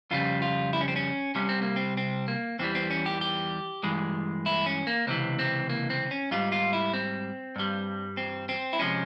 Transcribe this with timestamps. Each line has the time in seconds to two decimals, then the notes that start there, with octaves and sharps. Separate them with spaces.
0.11 F2 C#3 G3 F4
0.42 F4
0.73 E4
0.81 C#4
0.88 C4
0.96 C#4
1.35 C2 C3 G3 C#4
1.49 C4
1.62 A#3
1.76 C4
1.97 C4
2.28 A#3
2.59 E2 E3 G3 C4
2.75 C4
2.90 C#4
3.06 G4
3.21 G4
3.83 G2 E3 G#3
4.46 E4
4.66 C#4
4.87 A#3
5.07 C#2 C3 E3 C4
5.39 C4
5.70 A#3
5.90 C4
6.11 C#4
6.31 G#2 G3 F4
6.52 F4
6.73 E4
6.93 C4
7.56 G2 G3
8.17 C4
8.49 C4
8.73 E4
8.79 C3 F3 G#3 C#4